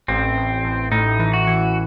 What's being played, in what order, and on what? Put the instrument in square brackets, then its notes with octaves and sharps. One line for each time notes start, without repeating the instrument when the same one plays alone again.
[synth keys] A1 [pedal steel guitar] C4
[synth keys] A1
A1
[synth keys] A2 [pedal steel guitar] D#4
[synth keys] E3
[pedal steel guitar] F#4
[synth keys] E3